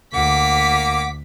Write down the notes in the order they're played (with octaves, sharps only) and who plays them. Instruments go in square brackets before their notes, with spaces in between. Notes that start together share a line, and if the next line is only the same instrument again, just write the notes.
[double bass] D2 [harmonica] A#3 D6 [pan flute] F#5 [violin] B6